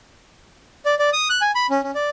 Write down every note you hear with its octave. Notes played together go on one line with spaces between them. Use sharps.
D5
D5
D#6
F#6
G#5
B5
C#4
C#4
D5